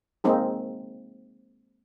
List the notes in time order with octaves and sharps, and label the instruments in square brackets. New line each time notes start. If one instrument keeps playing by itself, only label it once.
[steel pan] G#3 A#3 C4 D#4 G#4